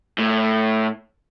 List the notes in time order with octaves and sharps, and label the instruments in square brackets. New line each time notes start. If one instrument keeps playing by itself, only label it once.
[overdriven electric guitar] A2